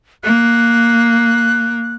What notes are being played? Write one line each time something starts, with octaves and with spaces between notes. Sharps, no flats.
A#3 F#6